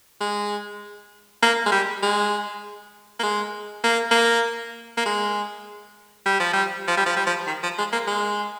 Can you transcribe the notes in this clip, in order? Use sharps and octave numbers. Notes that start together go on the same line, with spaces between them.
G#3
A#3
G#3
G3
G#3
A#3
G#3
A#3
A#3
A#3
G#3
G3
F3
G3
F3
G3
F3
G3
F3
D#3
F3
G#3
A#3
G#3